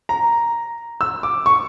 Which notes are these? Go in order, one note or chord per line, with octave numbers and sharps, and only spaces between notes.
A#5
E6
D6
C#6